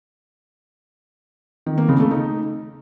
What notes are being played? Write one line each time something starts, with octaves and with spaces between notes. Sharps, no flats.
D#3
A#3
C#3
A3
D#4